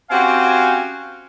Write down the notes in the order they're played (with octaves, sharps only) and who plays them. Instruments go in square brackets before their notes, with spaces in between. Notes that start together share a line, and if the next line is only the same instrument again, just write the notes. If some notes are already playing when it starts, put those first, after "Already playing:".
[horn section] C4 C#4 F#4 G4 F5 G#5